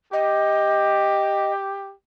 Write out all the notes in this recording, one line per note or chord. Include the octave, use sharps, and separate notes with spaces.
G4 D#5